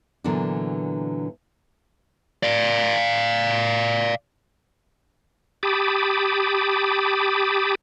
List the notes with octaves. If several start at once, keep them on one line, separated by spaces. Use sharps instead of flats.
A#2 D3 E3 F#3 B3 D4
D5 F5
G4 A5 B5 D6 D#6